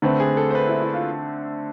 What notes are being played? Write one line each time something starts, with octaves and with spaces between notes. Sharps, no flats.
D3 A3 C4 B4
G#4
A4
C5
B4
E4
E4
F4